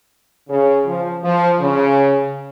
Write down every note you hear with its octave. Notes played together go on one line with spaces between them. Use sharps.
C#3
F3
F3
C#3